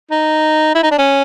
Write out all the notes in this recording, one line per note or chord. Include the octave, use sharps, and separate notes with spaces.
D#4
E4
D#4
D4
C#4